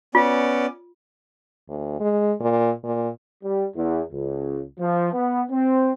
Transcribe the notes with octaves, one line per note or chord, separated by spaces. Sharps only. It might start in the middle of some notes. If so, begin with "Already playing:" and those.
B3 C#4 F4 D5
D2
G#3
A#2
A#2
G3
E2
C#2
F3
B3
C4